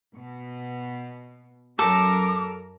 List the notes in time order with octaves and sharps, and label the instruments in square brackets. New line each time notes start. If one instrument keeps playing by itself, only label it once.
[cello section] B2
[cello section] F#2 A#4 [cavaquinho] A4 [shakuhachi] D6